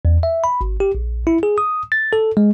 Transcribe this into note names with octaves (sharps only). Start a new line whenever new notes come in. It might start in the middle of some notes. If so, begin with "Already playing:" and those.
E2
E5
B5
G#1
G4
A#1
E4
G#4
D#6
A6
A4
G#3